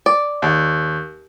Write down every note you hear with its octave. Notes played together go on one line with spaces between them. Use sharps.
D5
D#2